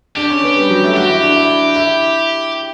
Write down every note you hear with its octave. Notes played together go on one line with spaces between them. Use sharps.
D4 G4
C#4
B3
G3
F#3
A3
F#4 G4
E4
D4
E4
E4